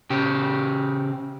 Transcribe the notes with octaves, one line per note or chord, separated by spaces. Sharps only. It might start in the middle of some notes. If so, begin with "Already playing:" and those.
C#3 G4